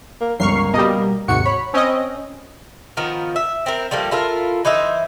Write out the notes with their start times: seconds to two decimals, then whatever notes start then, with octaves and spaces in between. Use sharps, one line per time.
0.21 A#3
0.40 G1 C#2 A#3 C#6 F6 C7
0.74 B2 G3 D#5 A#5
1.28 D#2 G#2 C3 F#4 C#7
1.46 C#5 B5
1.74 C4 C#4 D#5
2.97 D#3 F3 B3 A#4
3.36 E5
3.66 C4 E4 A#4
3.91 F3 G3 A3 A#3
4.11 E4 F4 A4 A#4
4.65 E3 D#4 C5 E5